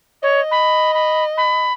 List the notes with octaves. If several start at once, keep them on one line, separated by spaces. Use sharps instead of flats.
C#5 D#5
B5
B5
B5